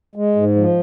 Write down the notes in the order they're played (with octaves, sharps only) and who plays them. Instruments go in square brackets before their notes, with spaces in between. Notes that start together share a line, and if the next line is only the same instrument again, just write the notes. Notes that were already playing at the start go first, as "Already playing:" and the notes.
[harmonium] G#3
G#2
F3